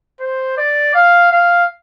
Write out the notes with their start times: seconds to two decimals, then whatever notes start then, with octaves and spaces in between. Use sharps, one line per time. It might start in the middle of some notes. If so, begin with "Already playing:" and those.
0.20 C5
0.58 D5
0.94 F5
1.32 F5